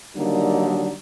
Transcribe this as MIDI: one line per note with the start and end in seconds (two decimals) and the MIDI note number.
0.16 0.92 50
0.16 0.92 51
0.16 0.92 54
0.16 0.92 55
0.16 0.92 58
0.16 0.92 63